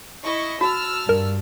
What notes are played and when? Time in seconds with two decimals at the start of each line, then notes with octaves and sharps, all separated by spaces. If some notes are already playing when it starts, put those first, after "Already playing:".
0.22 E4 D#5 C#6
0.61 F#4 A5 E6 F6
1.09 G2 A#4